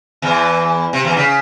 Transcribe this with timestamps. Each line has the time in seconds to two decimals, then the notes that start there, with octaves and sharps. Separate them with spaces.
0.22 E2 E3
0.93 C3
1.05 E2 E3
1.17 C#3